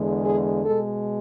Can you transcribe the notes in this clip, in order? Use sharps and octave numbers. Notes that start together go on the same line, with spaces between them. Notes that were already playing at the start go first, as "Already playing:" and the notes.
Already playing: E2 D3 G#3
G#4
B2 G#3 A4